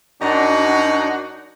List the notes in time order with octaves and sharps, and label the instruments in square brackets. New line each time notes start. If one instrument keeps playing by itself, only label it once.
[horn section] F#2 D4 D#4 F#4